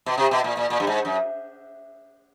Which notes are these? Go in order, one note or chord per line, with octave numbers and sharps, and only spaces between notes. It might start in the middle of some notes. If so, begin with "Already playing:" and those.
B2
C3
B2
A#2
A#2
A#2
G2
G#2
F#2